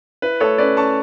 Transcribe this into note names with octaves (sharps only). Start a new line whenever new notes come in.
E4 B4
A3 A4 C#5
C#4 B4 D5
C#4 A5 C#6